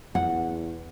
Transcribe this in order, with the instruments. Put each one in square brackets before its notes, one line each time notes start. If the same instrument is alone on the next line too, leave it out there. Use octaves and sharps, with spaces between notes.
[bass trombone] E2 [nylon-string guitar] F#5